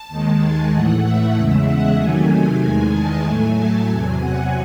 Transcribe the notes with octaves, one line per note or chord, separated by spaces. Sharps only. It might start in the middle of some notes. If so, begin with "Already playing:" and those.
Already playing: A5
D#2 D#3 G#3
G#5
A2 E3 A3 F#5
E5
E2 C#3 G#3
F#5
C3 D#3 F#3 A3 G#5
G#5
E2 D#3 G#3 G#5
A5
A2 F#3 A3 G#5
A5
E2 C3 F#3 G#5
F#5